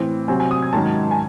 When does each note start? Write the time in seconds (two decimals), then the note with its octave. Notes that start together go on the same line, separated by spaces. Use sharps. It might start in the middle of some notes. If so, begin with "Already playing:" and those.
Already playing: A2 E3 C4
0.28 C3 F#3 C4 G#5
0.40 G#5
0.51 D#6
0.62 G#6
0.73 G#2 D#3 F#3 C#4 A5
1.11 G#5